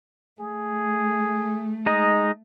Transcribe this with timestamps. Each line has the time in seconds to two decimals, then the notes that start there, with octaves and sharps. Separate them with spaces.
0.40 A3 G#4
1.86 G#3 D#4 D#5